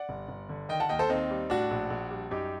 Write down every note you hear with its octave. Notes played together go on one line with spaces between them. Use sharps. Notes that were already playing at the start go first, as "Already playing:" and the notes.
Already playing: D5 F#5
G1
G1
D3
D#3 D#5 G5
F#5 A5
D#2 D#5 G5
A4 C5
D#2 C4 D#4
G3
A2 D4 F#4
A#1
A#1
G3
F#2 D#4 G4